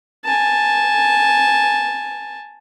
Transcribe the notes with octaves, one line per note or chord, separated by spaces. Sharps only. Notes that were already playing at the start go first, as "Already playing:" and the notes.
G#5 A5